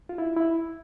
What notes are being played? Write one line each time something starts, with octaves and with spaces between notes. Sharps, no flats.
F4
E4
E4